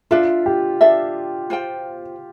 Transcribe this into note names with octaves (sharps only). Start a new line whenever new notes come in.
D4 F4 A4 E5
G4
D4 A4 E5
F4 C5 G5